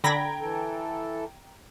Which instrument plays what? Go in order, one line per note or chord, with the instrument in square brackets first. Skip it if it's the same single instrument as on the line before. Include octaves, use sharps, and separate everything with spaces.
[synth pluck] D3 B5 A#6 [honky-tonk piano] G5 A#5 G#6
[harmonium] E3 A4